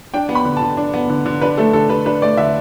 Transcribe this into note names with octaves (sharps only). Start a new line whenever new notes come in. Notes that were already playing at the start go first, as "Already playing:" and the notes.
D4 G5
B3
B5
D3
D3 A5
D4
B3
D3
D3
D4 B4
A3 A4
D3 A4
D3 B4
D4 B4
A3 D5
D3 E5